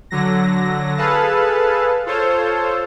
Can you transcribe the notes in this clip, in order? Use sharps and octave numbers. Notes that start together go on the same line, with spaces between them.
D3 F#3 A#6
G#4 A4 B4 F5 A5
F4 A4 C5 C#5